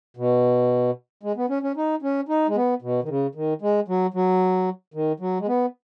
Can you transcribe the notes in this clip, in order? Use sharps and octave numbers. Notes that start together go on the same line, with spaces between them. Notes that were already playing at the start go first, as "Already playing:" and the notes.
B2
G#3
B3
C#4
C#4
D#4
C#4
D#4
G#3
B3
B2
D#3
C#3
D#3
G#3
F#3
F#3
D#3
F#3
G#3
B3